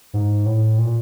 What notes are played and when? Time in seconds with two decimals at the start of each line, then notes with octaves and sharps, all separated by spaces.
0.14 G#2
0.46 A2
0.78 A#2